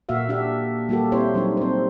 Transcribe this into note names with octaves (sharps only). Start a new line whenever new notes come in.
A#2 A#3 F#4 E5 F5
D4 G4 E5
G3 A#3 F#4 G4 A4
C4 E4 C5 C#5
F#3 G3 D4 D#4
C4 C5